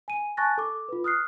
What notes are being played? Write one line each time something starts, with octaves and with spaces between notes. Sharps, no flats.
G#5 D#7
G#5 A5 C#6 F#6 A6 A#6
A4 D6
F4 B4
D#6 F6 F#6 C7